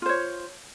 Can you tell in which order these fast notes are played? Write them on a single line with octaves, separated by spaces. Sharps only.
F4 C5 C#5